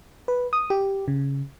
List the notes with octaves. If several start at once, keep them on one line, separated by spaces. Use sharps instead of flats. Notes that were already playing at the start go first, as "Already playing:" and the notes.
B4
D#6
G4
C#3